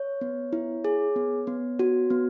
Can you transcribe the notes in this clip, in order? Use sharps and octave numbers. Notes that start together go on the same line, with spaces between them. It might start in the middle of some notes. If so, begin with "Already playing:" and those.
Already playing: C#5
B3
E4
G#4
B3
B3
F#4
B3